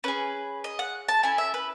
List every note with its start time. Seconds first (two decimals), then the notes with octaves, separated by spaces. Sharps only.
0.04 C#4 G#4 B4
0.64 D#5
0.79 F#5
1.08 A5
1.23 C#4 E4 A4 G#5
1.38 E5
1.54 B4